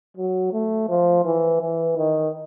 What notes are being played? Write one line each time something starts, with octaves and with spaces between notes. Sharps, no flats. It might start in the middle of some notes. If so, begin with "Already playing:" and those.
F#3
A3
F3
E3
E3
D#3